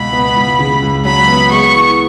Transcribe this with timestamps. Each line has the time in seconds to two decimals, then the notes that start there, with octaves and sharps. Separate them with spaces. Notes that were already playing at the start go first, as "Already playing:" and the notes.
Already playing: C#2 B2 B5
0.13 B3
0.36 C#2
0.59 C#3
0.82 C#2
1.05 F#3 B5
1.28 B3
1.51 G#3 C#6
1.73 E3